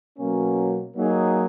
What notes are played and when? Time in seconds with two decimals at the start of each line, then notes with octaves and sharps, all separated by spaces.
0.17 B2 F#3 A#3 C#4
0.94 F#3 A#3 D#4 G#4